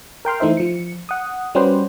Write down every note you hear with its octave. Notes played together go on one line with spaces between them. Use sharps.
A#4 G5 C6 F6
E3 A3 D#4 C5 E5
F3 C#7
F#5 D#6
G3 C#4 F#4 G4 B4 C5